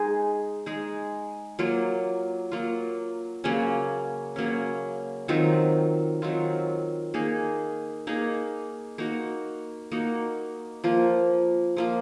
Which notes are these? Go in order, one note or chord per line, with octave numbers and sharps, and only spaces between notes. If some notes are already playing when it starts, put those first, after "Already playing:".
Already playing: G#3 D#4 G#4
G#3 D#4 G#4
F#3 A#3 F4
F#3 A#3 F4
C#3 F#3 A#3 C#4
C#3 F#3 A#3 C#4
D#3 F#3 C4 F4
D#3 F#3 C4 F4
A#3 D#4 G#4
A#3 D#4 G#4
A#3 D#4 F#4
A#3 D#4 F#4
F3 A#3 F4
F3 A#3 F4